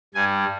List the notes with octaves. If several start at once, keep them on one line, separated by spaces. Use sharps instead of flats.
G2 G3 G#5